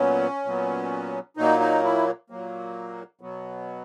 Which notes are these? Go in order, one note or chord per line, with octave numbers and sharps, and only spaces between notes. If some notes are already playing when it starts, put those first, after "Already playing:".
Already playing: A#2 F#3 B3 C#4
A#2 F#3 B3
A#2 F#3 A#3 D#4
D#4
E4
A#2 F#3 A#3
B2 F#3 B3